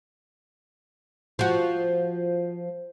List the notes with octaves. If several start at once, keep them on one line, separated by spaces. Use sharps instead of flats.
F3 F#4